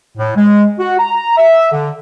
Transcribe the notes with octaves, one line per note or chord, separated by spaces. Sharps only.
A2
G#3
F#4
A#5
E5
D3